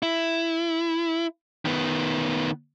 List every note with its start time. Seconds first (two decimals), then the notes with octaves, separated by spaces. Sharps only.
0.03 E4
1.65 D#3 B3